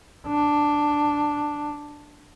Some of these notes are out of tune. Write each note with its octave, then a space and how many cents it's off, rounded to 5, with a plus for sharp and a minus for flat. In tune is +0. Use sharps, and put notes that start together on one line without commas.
D4 +5